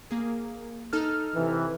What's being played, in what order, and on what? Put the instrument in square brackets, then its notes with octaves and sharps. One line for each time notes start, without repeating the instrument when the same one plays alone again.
[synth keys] A#3 G#4
D#4 A4 F6
[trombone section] C3 E3